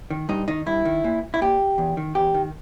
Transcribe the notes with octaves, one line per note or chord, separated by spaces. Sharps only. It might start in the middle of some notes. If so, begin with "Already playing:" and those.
D#3
G2 D#4
D#3 D#4
G2 E4
D#3
A#2
E4
A#2 G4
E2
D#3
E2 G4
D#3